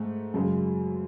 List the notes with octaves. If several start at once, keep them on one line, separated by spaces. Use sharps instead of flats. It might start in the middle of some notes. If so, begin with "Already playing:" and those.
Already playing: G#2 A3
F#2 C#3 G#3